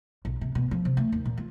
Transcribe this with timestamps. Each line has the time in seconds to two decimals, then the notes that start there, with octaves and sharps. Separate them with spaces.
0.25 B1
0.41 C3
0.55 B2
0.71 F3
0.85 C3
0.97 A3
1.12 D#2
1.25 A#2
1.38 F4